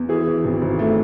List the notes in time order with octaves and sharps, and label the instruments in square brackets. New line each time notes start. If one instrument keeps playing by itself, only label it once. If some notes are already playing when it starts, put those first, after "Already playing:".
Already playing: [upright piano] E2
E3 G#4
E3
G#1
G#1
A3